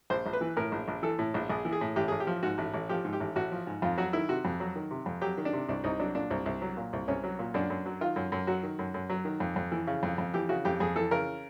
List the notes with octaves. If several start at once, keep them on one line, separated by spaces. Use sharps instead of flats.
A#1 C5
A#1
B4
E3
A2 A#4
A#1
A#1
E3 A4
A2
A#1
A#1 G#4
E3
G#4
A2
A1 G4
A1 G#4
G4
F3
G#2 F#4
A1
A1
F3 G4
G#2
G4
A1
A1 F#4
F3
G#2
F2 F4
F#3 F#4
D#3 E4
C3 F#4
F2
F#3
D#3
C3
F2
F#3 G4
D#3
D4
C3
C2 D4
C2 D#4
F#3 D4
A#2 D4
C2
C2
F#3
A#2
C2
C2 C#4
F#3
A#2
F#2 D4
F#2
F#3
D#3 F4
F#2
F#2
F#3 F#4
D#3
F#2
F#2
F#3
D#3
F2
F2
E3
C#3
F2
F2
E3 G4
C#3 F#4
F2 G4
F2 G#4
E3 A4
C#3 A#4